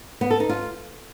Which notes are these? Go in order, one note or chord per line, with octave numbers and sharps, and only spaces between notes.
B3
A4
D#4
F4